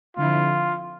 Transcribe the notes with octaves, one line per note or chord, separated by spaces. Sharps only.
D3 F3 C4 E4 F4